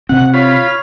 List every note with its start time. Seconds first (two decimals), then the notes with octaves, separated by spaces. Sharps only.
0.09 C3 C4 F#5
0.34 F4 C#5 B5
0.68 F6